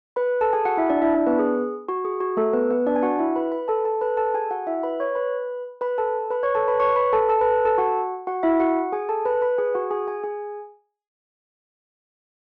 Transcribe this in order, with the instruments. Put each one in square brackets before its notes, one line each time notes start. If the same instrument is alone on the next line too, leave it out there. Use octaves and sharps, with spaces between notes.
[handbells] B4 B5
A4 A5
G#4 G#5
F#4 F#5
E4 E5
D4 D5
E4 E5
D4 D5
B3 B4
G#4
F#4
G#4
F#4
A3 A4
B3 B4
B3 B4
D4 D5
G#5
F#4 F#5
E4 E5
B4 B5
B4 B5
A4 A5
A4 A5
B4 B5
A4 A5
G#4 G#5
F#4 F#5
E4 E5
B4 B5
C#5 C#6
B4 B5
B4 B5
A4 A5
B4 B5
C#5 C#6
A4 A5
B4 B5
C#5 C#6
B4 B5
A4 A5
A4 A5
B4 B5
A4 A5
F#4 F#5
F#4 F#5
E4 E5
F#4 F#5
G#4 G#5
A4 A5
B4 B5
B4 B5
G#4 G#5
F#4 F#5
G#4 G#5
G#4 G#5
G#4 G#5